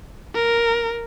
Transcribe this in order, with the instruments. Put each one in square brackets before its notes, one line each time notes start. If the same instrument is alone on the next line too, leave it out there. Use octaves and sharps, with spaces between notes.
[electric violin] A#4